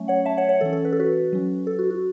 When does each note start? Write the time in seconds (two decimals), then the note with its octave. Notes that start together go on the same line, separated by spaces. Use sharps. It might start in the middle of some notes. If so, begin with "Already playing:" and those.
Already playing: F#3 A3 C#4
0.08 C#5 F#5
0.26 E5 A5
0.37 C#5 F#5
0.49 C#5 F#5
0.61 E3 C#4 A4
0.73 A4
0.85 B4
0.92 A4
1.00 F#4 B4
1.33 F#3 C#4
1.67 A4
1.79 F#4
1.90 F#4